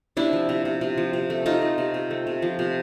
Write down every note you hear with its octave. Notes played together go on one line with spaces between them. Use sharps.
C3 D4 E4
F3
C3
C3
C3
F3
C3
A3
C3 D#4 F4
A3
C3
C3
A3
C3
F3
C3